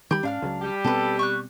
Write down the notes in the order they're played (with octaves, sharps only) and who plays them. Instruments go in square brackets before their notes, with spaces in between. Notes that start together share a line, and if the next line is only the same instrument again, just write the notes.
[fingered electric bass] D#3 G3 [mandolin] G4 B5
[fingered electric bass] G#2 C#4 [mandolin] D4 F5 F6
[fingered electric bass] C#2 C#3 F#3
[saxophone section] G3 G4
[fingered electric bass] B2 B3 C4 [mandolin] A4 B4
[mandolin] C#6 D6 F#6